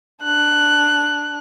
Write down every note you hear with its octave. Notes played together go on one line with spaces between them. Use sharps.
D4 F#6